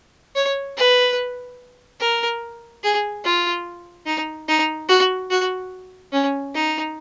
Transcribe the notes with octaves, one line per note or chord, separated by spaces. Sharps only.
C#5
B4
A#4
G#4
F4
D#4
D#4
F#4
F#4
C#4
D#4